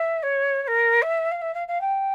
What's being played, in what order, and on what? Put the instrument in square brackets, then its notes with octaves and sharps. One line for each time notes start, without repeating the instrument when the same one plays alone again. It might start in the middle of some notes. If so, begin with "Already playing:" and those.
Already playing: [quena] E5
C#5
C#5
A#4
E5
F5
E5
F5
F5
G5